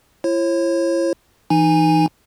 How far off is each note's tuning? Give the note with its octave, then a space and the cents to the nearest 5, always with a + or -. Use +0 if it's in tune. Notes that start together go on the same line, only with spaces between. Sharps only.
E4 +40 C#5 -40
E3 +10 D#4 -10 G#5 -15